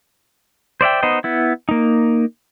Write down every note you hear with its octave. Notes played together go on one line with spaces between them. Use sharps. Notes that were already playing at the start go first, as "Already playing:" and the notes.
C5 D5 E5 G5
B3 D#4 C5 D#5
B3 E4
A#3 D#4